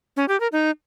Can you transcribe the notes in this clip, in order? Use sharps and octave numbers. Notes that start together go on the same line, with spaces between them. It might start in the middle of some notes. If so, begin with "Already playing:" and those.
C#4
G4
A#4
D#4